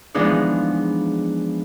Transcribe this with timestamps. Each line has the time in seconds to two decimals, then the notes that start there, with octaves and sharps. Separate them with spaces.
0.15 E3 F3 G#3 B3 D4 D#4